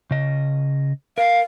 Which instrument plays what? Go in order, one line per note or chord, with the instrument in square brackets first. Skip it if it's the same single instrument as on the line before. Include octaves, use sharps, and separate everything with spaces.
[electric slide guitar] C#3 D#5
[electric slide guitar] A#4 [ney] F5